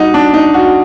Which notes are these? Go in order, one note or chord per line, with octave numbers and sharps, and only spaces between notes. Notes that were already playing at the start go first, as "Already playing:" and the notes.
Already playing: G3 D#4 F#4
D4
D#4
F#4